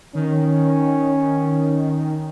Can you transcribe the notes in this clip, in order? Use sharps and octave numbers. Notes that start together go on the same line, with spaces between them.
D#3 C#4